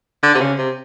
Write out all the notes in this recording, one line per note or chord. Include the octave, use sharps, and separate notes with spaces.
D3
C3
C#3
C3